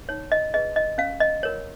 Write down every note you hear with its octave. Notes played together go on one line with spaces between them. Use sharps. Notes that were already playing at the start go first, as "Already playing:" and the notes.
D#4 C#5
D#5
G#4 B4 D#5
D#5
C#4 F5
D#5
F4 A#4 C#5